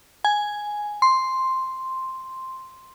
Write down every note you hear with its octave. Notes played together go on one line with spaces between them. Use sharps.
G#5
C6